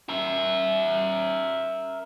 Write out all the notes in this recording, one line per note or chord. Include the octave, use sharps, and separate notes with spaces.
A#4 E5